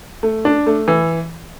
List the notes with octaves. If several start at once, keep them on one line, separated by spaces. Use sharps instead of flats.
A3
D4
A3
E3